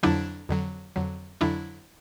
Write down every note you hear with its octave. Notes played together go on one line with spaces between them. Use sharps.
F2 D3 F#3 D4 E4
F2 D3 F#3
F2 D3 F#3
F2 D3 F#3 D4 E4